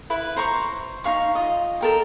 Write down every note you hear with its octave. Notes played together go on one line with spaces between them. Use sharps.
E4 B4
C5 A#5 C#6
D#4 G#4 F5 C#6
F4 D#5
A4 A#4 G5